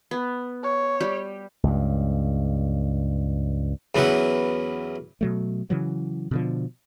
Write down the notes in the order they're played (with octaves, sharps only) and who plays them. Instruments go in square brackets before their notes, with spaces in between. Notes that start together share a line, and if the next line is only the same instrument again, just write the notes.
[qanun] B3
[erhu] C#5
[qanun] G3 G4
[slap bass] C#2 G2
[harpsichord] E2 F#3 B3 C#4 E4 F#5
[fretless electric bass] B2 F#3 A3
C#3 E3 F#3
B2 D3 F3